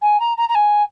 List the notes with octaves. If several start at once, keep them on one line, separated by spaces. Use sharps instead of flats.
G#5
A#5
A#5
A#5
G#5